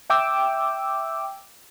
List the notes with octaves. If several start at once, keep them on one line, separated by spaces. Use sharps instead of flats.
E5 G5 D6 E6